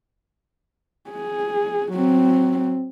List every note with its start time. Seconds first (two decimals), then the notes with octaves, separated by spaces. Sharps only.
1.10 G#4
1.92 F#3 C4